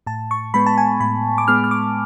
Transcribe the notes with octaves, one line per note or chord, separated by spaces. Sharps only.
A2 A5
C#6
G#3 B3 B5
A5
G#5
A2 B5
D6
G#3 B3 F6
F6
D6